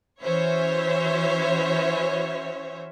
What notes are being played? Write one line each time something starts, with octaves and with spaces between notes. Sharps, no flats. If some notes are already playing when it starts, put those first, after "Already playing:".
E3 C#4 F#4 C5 C#5 E5